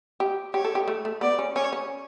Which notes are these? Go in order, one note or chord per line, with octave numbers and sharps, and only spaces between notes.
G4
G4 C#5
A4
G4
A3
A3
B3 D5
C#4
C#4 C#5
C#4